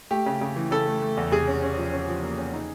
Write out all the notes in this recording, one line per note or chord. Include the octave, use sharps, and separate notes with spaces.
A3 G4
C#3
C#3
E3
C#3 A4
A3
A3
E2
C3 G#4
C#4
C#4
F3
C#4
F3
A#3
C#4
D#4